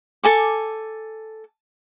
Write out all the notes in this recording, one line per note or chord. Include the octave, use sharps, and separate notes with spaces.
A4 G#5 D6